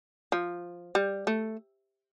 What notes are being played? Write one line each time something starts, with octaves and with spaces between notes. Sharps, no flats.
F3
G3
A3